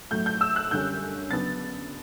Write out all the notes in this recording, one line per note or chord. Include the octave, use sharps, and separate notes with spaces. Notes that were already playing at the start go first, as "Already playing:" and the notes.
A2 F#3 A3 G6
G6
E6
F#6
F#2 D3 G3 C#4 G6
C#3 F#3 B3 D4 A6